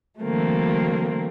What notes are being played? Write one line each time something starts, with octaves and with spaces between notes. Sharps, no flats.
D3 E3 F#3 A3 A#3 C4